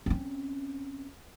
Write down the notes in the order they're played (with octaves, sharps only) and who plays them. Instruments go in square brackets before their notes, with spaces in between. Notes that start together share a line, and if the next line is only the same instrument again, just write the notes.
[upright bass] C4 C#4